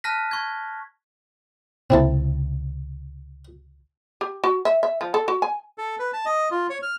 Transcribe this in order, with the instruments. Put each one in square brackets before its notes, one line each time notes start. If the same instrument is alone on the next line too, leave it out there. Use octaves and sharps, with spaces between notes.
[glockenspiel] A5 F6 F#6 A#6 B6
C#6 G#6
[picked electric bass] C#2 C3 [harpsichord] C4 E4 A4
[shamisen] G4
F#4
E5
E5
F3
A4
F#4
G#5
[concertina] A4
B4
A5
D#5
F4
C#5
F6